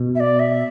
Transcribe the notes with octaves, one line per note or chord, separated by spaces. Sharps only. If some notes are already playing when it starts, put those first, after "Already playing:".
Already playing: B2
E5
D5
E5